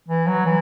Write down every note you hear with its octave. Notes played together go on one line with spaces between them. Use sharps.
E3
F#3
E3